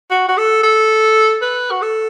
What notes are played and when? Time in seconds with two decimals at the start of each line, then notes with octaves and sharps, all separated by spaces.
0.10 F#4
0.28 F#4
0.37 A4
0.63 A4
1.42 B4
1.71 F#4
1.82 A4